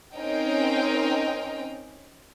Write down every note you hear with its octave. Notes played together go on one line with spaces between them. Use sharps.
C4 C#4 D#4 A#4 G5